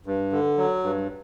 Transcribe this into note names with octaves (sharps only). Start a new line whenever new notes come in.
G2
D3
F#3
G2